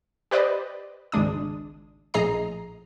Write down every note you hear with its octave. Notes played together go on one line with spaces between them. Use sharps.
G4 B4 C5 D5 D#5
G#1 C#2 G#3 D4 D#6
A#1 A2 G#4 D#5 A#5 C7